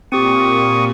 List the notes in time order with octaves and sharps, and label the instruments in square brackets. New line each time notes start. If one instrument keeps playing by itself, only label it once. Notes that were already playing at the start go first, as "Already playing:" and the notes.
[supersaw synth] A#2 [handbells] C4 G4 [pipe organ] C#6 D#6